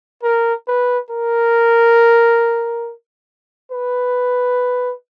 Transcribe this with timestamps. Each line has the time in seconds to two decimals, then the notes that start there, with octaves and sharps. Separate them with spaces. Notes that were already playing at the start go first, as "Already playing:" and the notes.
0.24 A#4
0.68 B4
1.10 A#4
3.72 B4